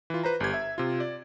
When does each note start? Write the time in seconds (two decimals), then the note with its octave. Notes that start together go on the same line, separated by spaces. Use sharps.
0.10 E3 F4
0.23 B4 C5 A#5
0.40 G1 G4 G#6
0.54 E5
0.78 C3 F4
1.00 D5